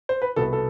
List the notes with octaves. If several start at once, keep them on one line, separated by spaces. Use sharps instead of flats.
C5
B4
C2 B2 B3 A4
A4